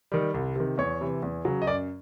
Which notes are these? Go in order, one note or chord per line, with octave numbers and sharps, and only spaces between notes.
D#3 G3
C2
C3 D#3
E2 C#5
C3 E3
E2
C#3 F#3
D#5
F#2 D5